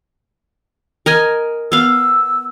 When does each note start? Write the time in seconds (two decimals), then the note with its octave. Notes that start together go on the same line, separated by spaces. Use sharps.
1.06 A#4 D#5 G#5
1.72 B3 F5 E6